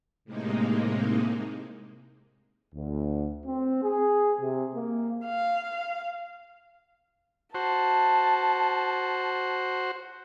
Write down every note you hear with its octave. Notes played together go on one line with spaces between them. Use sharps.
A2 C3 G#3 A#3 D#4
D2
C4
G#4
C3
A#3
F5
F#4 C5 A5